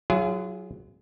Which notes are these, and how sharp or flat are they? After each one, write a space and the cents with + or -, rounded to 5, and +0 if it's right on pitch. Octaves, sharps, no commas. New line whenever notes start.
F#3 +0 F4 -40 G#4 +0